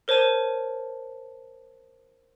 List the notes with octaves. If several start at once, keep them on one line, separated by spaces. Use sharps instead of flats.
A#4 C5 C#5 A5 D#7